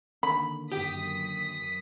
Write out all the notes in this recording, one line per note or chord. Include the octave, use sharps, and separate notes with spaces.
D3 D#3 A#3 B5
F#2 G4 D#6 B6